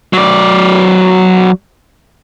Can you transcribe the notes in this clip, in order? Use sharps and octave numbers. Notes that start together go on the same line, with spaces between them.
F#3 D5